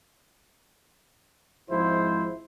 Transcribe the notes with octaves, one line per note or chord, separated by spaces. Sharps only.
G#1 F3 G#3 E4 F4 C5